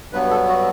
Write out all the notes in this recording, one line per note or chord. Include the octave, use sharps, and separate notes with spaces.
G2 F#3 B3 B4
A4
F#4